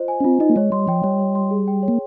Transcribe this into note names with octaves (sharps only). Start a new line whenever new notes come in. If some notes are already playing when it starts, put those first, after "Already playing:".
Already playing: F4 C5 D#5
G#5
C#4
C4 F4
D#4 D#5
A#3
G#3 C#5
G3 C6
F3 G5
G3 C#5
C#5
C6
G#4
G5
C#5
A#3